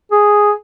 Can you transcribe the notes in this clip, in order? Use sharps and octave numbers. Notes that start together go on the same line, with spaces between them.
G#4